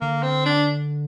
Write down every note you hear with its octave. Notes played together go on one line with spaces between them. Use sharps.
D3 A#3
C4
D4